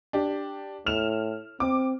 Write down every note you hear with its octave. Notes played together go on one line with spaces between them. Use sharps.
D4 G4
A2 F6 E7 F7
C4 D6